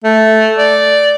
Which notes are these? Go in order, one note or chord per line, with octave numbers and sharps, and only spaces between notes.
A3
D5